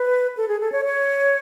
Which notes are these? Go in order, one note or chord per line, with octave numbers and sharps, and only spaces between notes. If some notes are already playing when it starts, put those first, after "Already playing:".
Already playing: B4
A4
G#4
A4
C#5
C#5